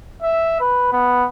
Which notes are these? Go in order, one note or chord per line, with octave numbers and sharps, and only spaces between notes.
E5
B4
B3